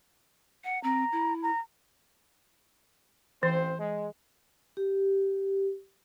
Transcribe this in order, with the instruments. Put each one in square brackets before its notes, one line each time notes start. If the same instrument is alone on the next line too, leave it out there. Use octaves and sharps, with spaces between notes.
[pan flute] F#5
[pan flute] C4 [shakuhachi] A#5
[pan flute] E4
[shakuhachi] A#5
[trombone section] A1 C4 C5 [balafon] E3
[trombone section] G#3
[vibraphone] G4